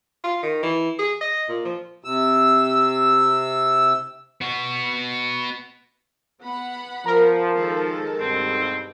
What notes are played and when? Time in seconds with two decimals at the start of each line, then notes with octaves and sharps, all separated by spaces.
0.24 F4
0.43 D#3
0.63 E3
0.99 G#4
1.21 D#5
1.48 A#2
1.65 F3
2.04 C3 E6
4.41 B3 F#4
6.41 B3 F#5 B5
7.06 F3 A#4
7.55 D#3 G#3 A4
8.20 G2 B2 C4